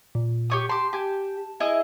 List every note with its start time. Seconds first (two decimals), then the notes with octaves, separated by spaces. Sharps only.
0.15 A#2
0.50 G4 C#5 D#6
0.69 G4 A5 C6
0.93 G4 G#5
1.60 E4 G#4 D#5